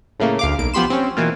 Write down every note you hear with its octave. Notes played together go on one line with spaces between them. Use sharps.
A2 C#3 A3 A#3
D2 F5 D6
B1 A#3 D7
F3 B3 G4 B5 C6 E7
C4 C#4
B2 E3 A#3 F4